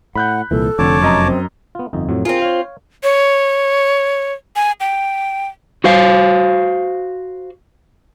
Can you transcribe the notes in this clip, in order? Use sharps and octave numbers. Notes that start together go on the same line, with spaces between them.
A2 F#5 B5 F#6 G6
C2 A#2 E3 A4
F1 F2 D3 C#5 A5 D6
F#2 D#5 A#5
C4
B3 F4
G1 F2 D#4
F2 A2 F#3
C4 F4 G#4 A#4
C#5 F5
C#5
G#5
G5
F#4 C5 F5